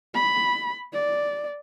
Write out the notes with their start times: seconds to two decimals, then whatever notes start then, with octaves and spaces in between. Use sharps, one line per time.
0.14 B5
0.93 D5